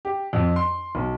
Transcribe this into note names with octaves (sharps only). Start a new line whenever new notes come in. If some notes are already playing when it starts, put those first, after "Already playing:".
G4
F2
C6
B1